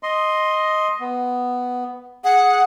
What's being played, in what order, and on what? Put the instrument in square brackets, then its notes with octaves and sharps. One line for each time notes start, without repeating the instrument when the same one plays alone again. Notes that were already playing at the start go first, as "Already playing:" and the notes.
[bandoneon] D#5 C6
B3
[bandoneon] G#4 [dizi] F#5